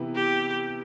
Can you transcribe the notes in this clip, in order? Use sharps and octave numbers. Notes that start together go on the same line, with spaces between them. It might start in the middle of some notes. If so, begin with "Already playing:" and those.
Already playing: C3 E3 B3 E4
G4